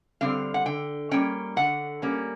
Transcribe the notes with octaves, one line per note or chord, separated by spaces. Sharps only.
D3 G3 C4 F5
F#5
D3 G5
G3 A#3 C#4 G5
D3 F#5
G3 A#3 C#4